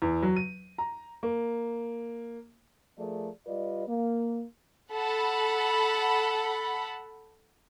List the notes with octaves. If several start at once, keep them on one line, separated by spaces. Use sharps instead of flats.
E2
F#3
D#7
A#5
A#3
F3 A3 G#4 A#4 D5
G3 F4 B4 D5 D#5
A#3
A4 F#5 B5